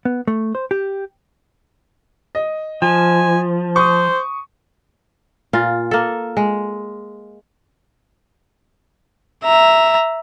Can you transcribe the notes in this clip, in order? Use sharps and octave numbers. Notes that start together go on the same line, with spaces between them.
B3
A3
C5
G4
D#5
F3 G#5
C5 C#6 D#6
A#2 F4
A#3 A4
G#3
E5 A#5